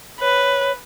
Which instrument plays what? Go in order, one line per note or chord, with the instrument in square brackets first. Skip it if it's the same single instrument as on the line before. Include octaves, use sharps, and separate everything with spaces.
[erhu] B4 [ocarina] C#5